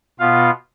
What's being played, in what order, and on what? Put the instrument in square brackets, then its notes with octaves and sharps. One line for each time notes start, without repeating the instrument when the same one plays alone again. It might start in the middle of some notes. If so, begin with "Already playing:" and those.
[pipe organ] B2 B3 F4 F5